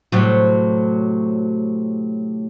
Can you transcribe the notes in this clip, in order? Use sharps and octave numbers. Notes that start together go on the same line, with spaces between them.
A2 C3 F#3